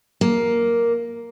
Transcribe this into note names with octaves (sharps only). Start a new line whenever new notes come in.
A#3